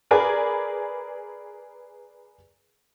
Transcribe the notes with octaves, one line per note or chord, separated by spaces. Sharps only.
G#4 A#4 B4 D5 G#5